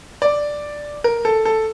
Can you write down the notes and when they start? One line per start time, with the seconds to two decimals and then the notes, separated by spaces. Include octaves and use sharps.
0.22 D5
1.04 A#4
1.25 A4
1.45 A4